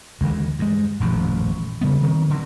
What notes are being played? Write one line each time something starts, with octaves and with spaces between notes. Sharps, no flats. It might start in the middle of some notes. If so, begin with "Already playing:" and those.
D#2 D3 E3 G#3
G2 G#3
D#1 A1 F#2 F3
C#3 G3 B3
D#3 F#3 C4
D3 D#3 F#3